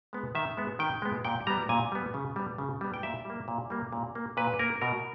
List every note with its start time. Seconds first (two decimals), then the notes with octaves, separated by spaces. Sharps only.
0.13 G#3 B3
0.35 D#3 E5
0.57 G#3 B3
0.79 D#3 G5
1.02 G#3 B3
1.25 A#2 G5
1.47 G3 B3 A#5
1.69 A#2 G#5
1.92 G3 B3
2.14 C#3
2.36 G3 B3
2.58 C#3
2.81 G3 B3
2.94 G5
3.03 A#2 E5
3.25 G3 A#3
3.48 A#2
3.70 G3 A#3
3.92 A#2
4.15 A#3
4.37 A#2 B4
4.59 A#3 A#4
4.81 B2 A#4